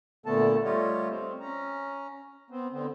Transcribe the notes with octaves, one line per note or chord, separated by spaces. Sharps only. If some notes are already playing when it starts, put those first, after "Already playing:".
A#2 D3 A3 B3 A4 A5
G3 A3 F4 G4 C#5 D#5
C4
C#4 A#5
B3 C4
D3 B3 C4